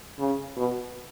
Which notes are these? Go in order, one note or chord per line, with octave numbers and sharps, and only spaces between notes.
C#3
B2